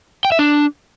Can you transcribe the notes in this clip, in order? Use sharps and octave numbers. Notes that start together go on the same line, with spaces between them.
G5
E5
D4